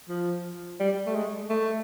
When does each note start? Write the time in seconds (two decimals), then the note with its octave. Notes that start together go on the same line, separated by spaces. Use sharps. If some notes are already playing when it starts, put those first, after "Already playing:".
0.09 F3
0.80 G3
1.06 A3
1.15 G#3
1.50 A3